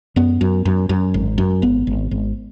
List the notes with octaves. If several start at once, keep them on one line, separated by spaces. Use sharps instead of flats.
F#2 B3
F#2
F#2
F#2
G#1
F#2
G#1 B3
G#1
G#1